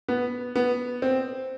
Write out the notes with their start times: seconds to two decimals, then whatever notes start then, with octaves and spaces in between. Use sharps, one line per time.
0.08 B3
0.55 B3
1.02 C4